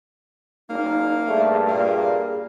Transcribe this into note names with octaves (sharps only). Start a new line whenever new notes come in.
F#1 A#3 D#4
G2 A3 G#4
A#2 A#3 G#4